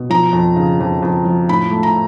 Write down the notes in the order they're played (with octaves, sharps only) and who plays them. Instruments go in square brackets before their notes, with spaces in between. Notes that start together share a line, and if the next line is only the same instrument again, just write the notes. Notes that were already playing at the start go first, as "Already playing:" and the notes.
Already playing: [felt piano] B2
F3 A#5
F2
C#3
F2
F2
F3
A2 B5
A3
A#5